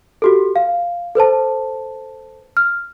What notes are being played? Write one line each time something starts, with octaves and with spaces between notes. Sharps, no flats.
F#4 G4 A4
F5
A4 B4 C5 A5
F6